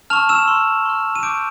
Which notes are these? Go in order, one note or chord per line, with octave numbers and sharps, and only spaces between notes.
A5 C#6 E6 F6 F7
E6 E7
C6 F6
C6 F6
D#7
C#6 D6 E6 G6 D7